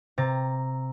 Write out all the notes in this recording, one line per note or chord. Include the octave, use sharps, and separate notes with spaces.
C3 A#5 A6